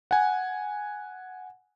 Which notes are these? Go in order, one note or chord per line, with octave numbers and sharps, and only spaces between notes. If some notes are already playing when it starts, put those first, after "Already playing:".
F#5 G#5